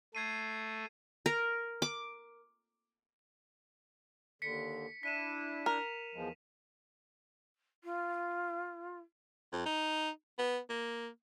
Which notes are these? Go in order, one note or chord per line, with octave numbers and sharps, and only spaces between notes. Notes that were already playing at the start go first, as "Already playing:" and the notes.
A3 G#6 C7 D#7
A#4
D6
D#2 D3 B6 C#7
D4 E4 B6 D#7 E7
A#4 F7
E2 F3 G#3
F4
F2
D#4
B3
A#3